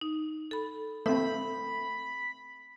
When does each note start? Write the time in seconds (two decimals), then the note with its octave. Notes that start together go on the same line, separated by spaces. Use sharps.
0.01 D#4
0.51 A4 B5
1.06 A3 C4 E5 B5